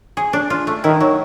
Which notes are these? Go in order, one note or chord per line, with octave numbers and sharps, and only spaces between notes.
G#4
D4
F4
A3
D#3 E4
F#3